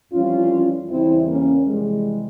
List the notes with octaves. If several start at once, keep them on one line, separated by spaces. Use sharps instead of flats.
F2 E3 G3 C#4 F4
E2 C#3 E3 G3 C4 E4
A#3 C#4
F2 C3 E3 G3 G#3